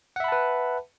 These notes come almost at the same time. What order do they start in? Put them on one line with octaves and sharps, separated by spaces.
F#5 E5 B5 A5 B4